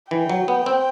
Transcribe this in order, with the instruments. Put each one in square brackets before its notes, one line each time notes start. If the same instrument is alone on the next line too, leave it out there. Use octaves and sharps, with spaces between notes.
[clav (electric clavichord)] E3 [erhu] G5
[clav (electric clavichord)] F#3
B3
C4